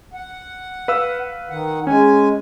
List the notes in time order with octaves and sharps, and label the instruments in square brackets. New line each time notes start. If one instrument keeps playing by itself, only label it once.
[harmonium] F#5
[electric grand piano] B4 F5 E6
[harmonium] D#3 F#5
[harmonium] G#3 G#5 [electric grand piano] C#4